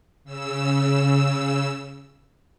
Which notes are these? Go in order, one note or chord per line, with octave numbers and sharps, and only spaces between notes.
C#3 E6